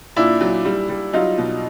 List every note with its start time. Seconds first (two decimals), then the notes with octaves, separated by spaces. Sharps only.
0.16 A#2 D4 E4
0.41 F#3
0.65 G3
0.89 G3
1.13 F#3 D#4 F4
1.38 B2